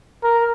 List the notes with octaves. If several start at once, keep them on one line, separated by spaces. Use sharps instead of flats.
A#4